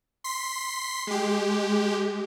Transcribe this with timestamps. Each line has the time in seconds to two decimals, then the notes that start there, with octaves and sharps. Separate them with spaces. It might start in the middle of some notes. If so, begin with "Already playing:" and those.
0.24 C6 B6 C7
1.07 G#3 G4